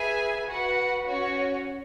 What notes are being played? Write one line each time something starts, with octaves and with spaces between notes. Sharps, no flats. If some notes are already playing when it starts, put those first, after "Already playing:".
Already playing: G#4 B4 E5 G#5
F#4 B4 F#5
C#4 F#4 C#5